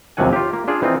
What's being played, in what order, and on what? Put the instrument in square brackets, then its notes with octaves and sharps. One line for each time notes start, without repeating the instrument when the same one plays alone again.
[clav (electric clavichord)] D#2 C3 F3 F#3 F#5 G#5
F4 G4
A#3
D4 F4 G#4
E3 C4 D#4 F4